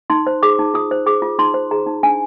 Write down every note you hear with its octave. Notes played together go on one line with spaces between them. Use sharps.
D#4 C6
C5
G#4 D6
D#4
F4 D#6
C5
G#4 D6
F4
D#4 C6
C5
G#4 A#5
D#4
D4 G#5